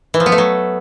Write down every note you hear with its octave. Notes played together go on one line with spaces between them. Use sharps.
E3
F3
B3
A3
F#3